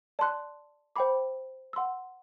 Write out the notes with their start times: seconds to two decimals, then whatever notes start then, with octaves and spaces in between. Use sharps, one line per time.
0.19 D5 A5 C6 F#6
0.96 C5 G5 B5 D6
1.73 F#5 C6 E6